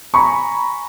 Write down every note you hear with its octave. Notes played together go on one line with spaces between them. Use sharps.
G#5 A#5 B5 C#6